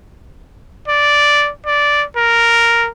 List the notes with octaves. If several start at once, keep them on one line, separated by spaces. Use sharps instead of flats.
D5
D5
A#4